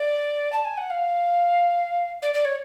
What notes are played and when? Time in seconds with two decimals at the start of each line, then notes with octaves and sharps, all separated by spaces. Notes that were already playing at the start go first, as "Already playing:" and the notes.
Already playing: D5
0.53 A5
0.65 G#5
0.78 F#5
0.90 F5
2.22 D5
2.34 D5
2.45 C#5